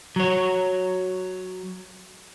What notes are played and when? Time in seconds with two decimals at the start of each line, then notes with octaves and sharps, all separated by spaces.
0.16 F#3 C#5